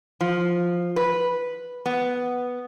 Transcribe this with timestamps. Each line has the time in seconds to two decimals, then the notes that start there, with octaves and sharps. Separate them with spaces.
0.21 F3
0.96 B4
1.86 B3